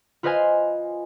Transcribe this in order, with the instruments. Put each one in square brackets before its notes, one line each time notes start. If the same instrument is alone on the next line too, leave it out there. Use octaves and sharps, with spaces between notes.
[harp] F4 B4 C5 D#5 F5 G#5